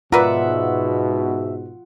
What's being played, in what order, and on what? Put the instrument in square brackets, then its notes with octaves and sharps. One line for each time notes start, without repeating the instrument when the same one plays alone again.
[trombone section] G#2 B2 [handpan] F4 F#5 [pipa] A#4 B4 D5 [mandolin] E5